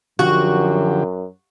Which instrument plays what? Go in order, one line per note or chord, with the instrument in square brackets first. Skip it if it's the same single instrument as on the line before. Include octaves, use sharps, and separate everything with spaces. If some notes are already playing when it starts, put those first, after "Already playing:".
[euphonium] F#2 [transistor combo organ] D3 F3 G4 [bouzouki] F#4